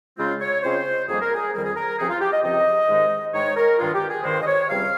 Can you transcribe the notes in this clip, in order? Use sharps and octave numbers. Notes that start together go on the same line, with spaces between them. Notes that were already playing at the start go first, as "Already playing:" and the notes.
C#3 G#3 C4 F4
C#5
C#3 G#3 C4 F4 C5
F2 D#3 G3 A#3 G#4
A#4
G#4
F2 D#3 G3 A#3 A#4
G#4
A#4
C#2 C3 F3 C4 D#4 G#4
F4
G4
D#5
C#2 C3 F3 C4 D#4 D#5
G#2 D#3 G#3 D#4
G#2 D#3 G#3 D#4 C#5
A#4
G2 D#3 G#3 F4
G4
G#4
G2 D#3 G#3 C5
D#5
C#5
C#2 C3 G3 C4 F5